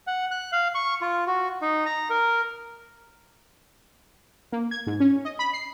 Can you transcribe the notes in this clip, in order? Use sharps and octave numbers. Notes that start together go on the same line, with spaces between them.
F#5
F#6
F5
C#6
F4
F#4
D#4
A#5
A#4
A#3
G#6
G#2
C#4
D#5
B5
C7